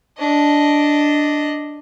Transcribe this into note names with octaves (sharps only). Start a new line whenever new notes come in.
D4 D#5